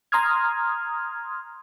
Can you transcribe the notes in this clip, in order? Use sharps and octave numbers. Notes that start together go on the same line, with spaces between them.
A#5 C6 D#6 F6 G#6